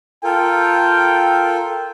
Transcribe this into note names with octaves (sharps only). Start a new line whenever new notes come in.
F4 A4 A#4 G5